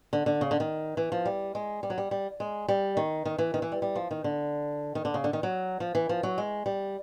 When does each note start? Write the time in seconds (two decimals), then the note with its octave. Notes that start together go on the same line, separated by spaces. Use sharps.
0.13 D3
0.26 D3
0.41 C#3
0.51 D3
0.60 D#3
0.97 E3
1.12 F3
1.26 G3
1.55 G#3
1.83 G3
1.90 F#3
1.98 G3
2.11 G3
2.40 G#3
2.68 G3
2.97 D#3
3.25 D#3
3.39 E3
3.54 D#3
3.62 E3
3.72 G3
3.82 G3
3.96 F3
4.11 D#3
4.24 D3
4.95 D#3
5.05 D3
5.14 C#3
5.24 D3
5.33 D#3
5.43 F#3
5.80 F3
5.95 E3
6.09 F3
6.23 F#3
6.38 G#3
6.66 G3